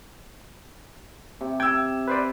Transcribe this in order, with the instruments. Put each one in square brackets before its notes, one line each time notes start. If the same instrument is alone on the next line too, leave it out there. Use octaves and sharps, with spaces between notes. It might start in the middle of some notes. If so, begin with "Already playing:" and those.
[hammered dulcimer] C3
[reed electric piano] G5 [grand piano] E6 G#6
[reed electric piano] B4 C5 D5